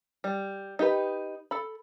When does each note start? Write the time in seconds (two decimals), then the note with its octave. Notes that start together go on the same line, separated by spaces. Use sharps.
0.24 G3
0.79 D#4 G4 B4
1.51 A4 B5